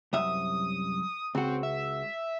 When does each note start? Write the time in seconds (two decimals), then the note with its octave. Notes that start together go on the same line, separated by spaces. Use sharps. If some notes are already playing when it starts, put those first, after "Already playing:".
0.13 C2 F#2 E5 D#6
1.35 C#2 C4 F#4
1.63 E5